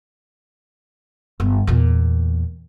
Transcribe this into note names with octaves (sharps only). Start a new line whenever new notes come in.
G1
E2 A#2